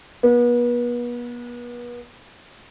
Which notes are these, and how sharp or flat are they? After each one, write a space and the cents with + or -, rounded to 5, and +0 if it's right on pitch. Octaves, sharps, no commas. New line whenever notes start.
B3 -35